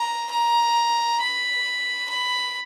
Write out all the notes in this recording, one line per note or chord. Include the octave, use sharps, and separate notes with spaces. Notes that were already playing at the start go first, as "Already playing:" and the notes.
Already playing: A#5
A#5
B5
B5